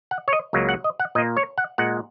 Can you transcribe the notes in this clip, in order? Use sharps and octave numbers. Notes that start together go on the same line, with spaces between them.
F#5
C#5
D#5
C#2 C#3 F#3 A#3
F#5
D#5
F#5
A#2 A#3 D#5
C#5
F#5
A#2 G#3 F#5